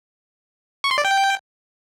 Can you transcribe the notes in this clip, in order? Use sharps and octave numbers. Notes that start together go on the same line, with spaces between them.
C#6
C6
D5
G5